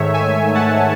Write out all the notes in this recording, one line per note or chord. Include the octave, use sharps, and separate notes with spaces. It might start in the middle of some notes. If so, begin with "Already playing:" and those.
Already playing: G#2 D#3 A3 C#5 E5
E5 G#5
F#5 A5